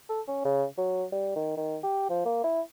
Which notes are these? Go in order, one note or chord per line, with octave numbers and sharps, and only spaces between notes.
A4
C#4
C#3
F#3
G3
D#3
D#3
G4
F3
A#3
E4